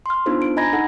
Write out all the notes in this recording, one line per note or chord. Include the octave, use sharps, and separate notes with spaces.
C6 F6
B3 D4 D#4 F4 A4 C5
D4 D7
D#5 G#5 A#5 B5 G#6 A#6
D#4 A4 F#5